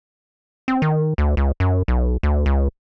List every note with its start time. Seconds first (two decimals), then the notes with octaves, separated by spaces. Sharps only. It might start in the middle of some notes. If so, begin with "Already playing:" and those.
0.68 C4
0.82 D#3
1.18 D2
1.37 C#2
1.60 F#2
1.88 B1
2.23 D2
2.46 C#2